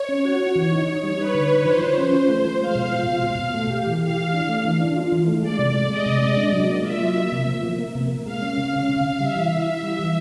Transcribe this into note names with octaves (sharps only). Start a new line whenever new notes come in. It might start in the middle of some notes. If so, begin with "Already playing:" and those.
Already playing: C#5
C#4
F#4
F#4
E3
D#4 C#5
D#4
G3
D#4 B4
D3
D#4
F3 C5
F3
C#4
F3
A3
F3
G#3 F5
B2
F4
B2 F5
B2
B2
A3
G4
E3
G4 F5
E3
D4
A3
E3
D4
F4
E3
A3
G#3 D5
C3
G#3
G#3 D#5
C3
G#3
D4
F#3
A#3
F4 E5
F#3
A#3
C3
F3
A#3
A#3
C3
A#3
G#3 F5
C#4
C#3
C#4
C#3
C#3
G3 E5
E3
E4
E4 E5
G3
E3